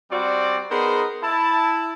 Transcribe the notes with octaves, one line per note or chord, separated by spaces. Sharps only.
G3 C4 F#4 D5
B3 D#4 G#4 A#4 C5
E4 A5